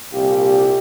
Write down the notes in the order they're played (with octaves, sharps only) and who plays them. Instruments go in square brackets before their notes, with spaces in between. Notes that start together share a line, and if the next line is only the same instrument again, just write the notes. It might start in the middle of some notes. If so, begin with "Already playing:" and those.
[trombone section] C2 A#2 F4 G4